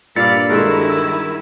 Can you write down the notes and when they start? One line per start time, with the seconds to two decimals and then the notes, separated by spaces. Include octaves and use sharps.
0.16 G2 A#2 D5 F5 B5 E6 A6 C#7
0.49 D#3 G#3 E4 F#4 A4 A#4 E6
0.90 E6